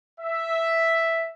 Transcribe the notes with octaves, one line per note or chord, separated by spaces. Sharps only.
E5